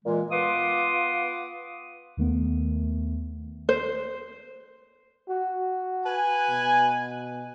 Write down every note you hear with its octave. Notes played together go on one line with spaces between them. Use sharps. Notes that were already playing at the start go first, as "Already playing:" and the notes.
A#2 E3 G#3
B3 F4 B4 C6 D6 D#6
D#2 D#3 A3 B3
C5
F#4
B4 G#5
B2